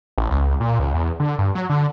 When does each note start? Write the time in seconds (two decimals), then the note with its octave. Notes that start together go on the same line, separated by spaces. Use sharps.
0.18 A1
0.31 C#2
0.60 A#2
0.79 C#2
0.94 E2
1.20 D3
1.39 G2
1.55 F#3
1.70 D3